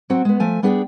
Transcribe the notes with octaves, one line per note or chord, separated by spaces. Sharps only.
F#3 C4 F#4
G#3 B3
F3 A3 G#5
G3 B3 D4 G#4 D5 G5